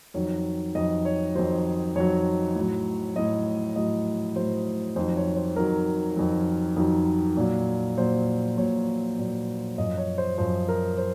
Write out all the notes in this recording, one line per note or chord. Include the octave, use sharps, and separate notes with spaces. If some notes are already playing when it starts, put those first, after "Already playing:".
F2 D#3 F#3 C#5
F2 D#3 F#3 D#5
C#5
F2 D#3 F#3 C5
F2 D#3 F#3 C#5
A2 F#3
A2 F#3 D#5
A2 F#3 D#5
A2 F#3 C5
F2 D#3 F#3 C5
C#5
C5
F2 D#3 F#3 A#4
F2 D#3 F#3
F2 D#3 F#3
A#2 F#3
A#2 F#3 C5
A#2 F#3 C#5
A#2 F#3
F#2 F3 D#5
C#5
C5
F#2 F3 C5
A#4
C5